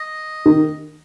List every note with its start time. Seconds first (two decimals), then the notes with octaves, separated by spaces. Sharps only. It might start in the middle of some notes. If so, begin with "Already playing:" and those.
Already playing: D#5
0.46 D#3